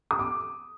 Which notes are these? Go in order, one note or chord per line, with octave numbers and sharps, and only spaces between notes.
D#6
D6